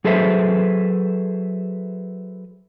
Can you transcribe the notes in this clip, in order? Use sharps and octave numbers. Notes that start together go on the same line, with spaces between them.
F#3 G#4 A4 B4 C5 E5